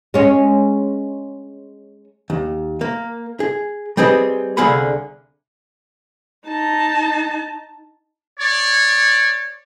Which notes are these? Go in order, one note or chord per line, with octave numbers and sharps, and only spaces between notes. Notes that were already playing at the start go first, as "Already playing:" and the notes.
G#3 C#4
D#2
A#3
G#4
G3 C4 G#4 B4 D#5
C2 D3 G#4 F5 F#5 B5
D#4 A5
C#5 D5